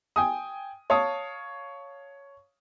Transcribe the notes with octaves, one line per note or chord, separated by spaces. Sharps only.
G5 G#5 D#6
C#5 F5 A5 D#6